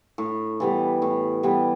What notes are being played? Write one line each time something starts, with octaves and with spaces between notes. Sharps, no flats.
A2
E3 G3 B3
A2
E3 G3 B3